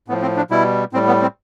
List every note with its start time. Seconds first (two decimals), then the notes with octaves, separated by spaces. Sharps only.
0.08 A2 B3
0.11 F3
0.22 C4
0.37 D4
0.51 B2 G3 E4
0.93 A2 G3 C4
1.07 B3
1.22 C4